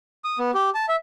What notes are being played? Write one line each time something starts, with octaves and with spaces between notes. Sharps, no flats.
D#6
B3
G4
A5
E5